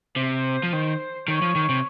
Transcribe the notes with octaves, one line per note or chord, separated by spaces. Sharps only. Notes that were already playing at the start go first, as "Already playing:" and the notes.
C3 C5
F3
D#3
D#3 C#5
F3
D#3
C3